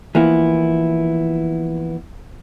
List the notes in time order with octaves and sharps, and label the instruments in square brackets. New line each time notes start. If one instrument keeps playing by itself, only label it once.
[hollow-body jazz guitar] E3 F3 A#3 B3 E4